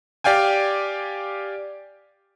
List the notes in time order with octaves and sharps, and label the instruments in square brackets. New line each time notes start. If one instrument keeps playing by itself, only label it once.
[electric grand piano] G4 D5 F5 G5 G#5